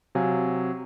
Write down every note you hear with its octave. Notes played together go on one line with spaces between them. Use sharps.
C3 F#3 F5 G#5